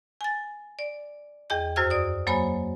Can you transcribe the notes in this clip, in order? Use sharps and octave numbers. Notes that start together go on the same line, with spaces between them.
G#5 A6
D5
E2 G#4 D#5 G5 G6
F#2 F#4 C5 E6 F6 G#6
D5 D#6
F#3 A#3 C5 C#5 G#5 B5